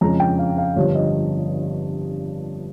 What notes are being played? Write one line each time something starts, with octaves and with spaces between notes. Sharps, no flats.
F2 C#3 G#3 C#4 A#5
G5
F5
F5
G1 G2 F3 C#5
D#5